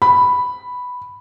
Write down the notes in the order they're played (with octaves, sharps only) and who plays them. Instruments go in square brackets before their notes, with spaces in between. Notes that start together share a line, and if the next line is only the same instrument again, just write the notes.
[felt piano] B5